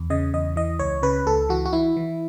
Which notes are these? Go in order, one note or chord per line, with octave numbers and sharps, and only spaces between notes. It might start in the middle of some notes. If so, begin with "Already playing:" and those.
Already playing: E2
C#3 D#5
E2 D#5
E3 D#5
C#2 C#5
C#3 B4
C#2 A4
E3 F#4
F#4
E3 E4
E3